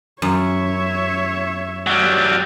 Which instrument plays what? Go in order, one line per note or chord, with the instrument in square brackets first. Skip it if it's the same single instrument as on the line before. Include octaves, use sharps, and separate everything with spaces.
[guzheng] F#2 [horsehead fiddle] C#5 E5
[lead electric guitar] F#3 G3